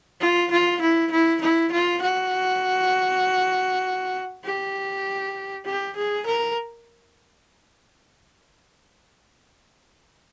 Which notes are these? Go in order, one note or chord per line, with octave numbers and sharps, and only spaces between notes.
F4
F4
E4
E4
E4
F4
F#4
G4
G4
G#4
A#4